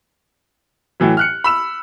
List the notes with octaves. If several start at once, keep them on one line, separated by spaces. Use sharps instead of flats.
A2 E3 F#3
F6 F#6 C#7
B5 E6 E7